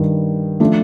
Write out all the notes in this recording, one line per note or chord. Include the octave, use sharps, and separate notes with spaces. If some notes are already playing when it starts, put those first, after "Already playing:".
Already playing: G2 D#3 G3
F3 A3 D4 F4